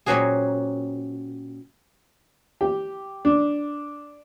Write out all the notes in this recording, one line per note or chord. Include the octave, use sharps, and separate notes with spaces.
A#2 F#3 C4 C#4 F#4 G#4
G4
D4